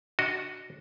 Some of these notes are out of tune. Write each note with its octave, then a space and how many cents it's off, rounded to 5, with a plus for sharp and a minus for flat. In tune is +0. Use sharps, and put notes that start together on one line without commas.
D4 +0 F#4 +0 D#5 +0